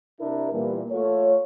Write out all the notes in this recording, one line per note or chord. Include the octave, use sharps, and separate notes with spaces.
C3 D4 E4 A#4
A#2 E3 G3 A#3 B3
A3 F4 A4 C#5